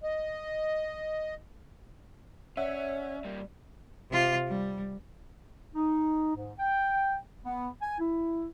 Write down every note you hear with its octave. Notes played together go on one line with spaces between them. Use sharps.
D#5
C#4 C#5 D5 E5 F#5
G3 A#3
C3 F4
G3
D#4
G#2
G5
B3
G#5
E4